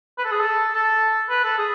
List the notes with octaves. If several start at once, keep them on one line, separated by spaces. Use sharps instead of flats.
B4
A4
G#4
A4
A4
B4
A4
G#4